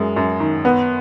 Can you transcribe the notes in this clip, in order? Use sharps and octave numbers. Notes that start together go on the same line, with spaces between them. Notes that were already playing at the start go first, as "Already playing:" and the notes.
Already playing: F#2 G#3
F#2
D#3
B3